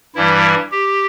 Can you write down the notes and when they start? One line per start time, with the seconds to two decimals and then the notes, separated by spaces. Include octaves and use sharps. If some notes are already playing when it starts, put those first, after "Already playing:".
0.15 G2 E3 G3 E4
0.72 G4